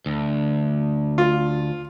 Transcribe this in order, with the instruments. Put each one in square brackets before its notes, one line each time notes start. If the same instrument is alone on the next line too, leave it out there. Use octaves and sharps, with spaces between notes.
[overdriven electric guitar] D2
[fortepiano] F4